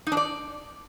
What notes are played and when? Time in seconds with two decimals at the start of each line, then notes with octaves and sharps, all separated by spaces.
0.07 D#4
0.12 D4
0.17 D5